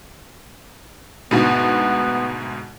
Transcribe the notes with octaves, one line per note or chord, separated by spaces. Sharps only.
D2 G#2 B2 B3